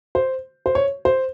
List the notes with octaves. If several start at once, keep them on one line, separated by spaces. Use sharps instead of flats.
C5
C5
C#5
C5